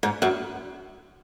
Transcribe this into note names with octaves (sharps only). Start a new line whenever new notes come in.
G#2
F#2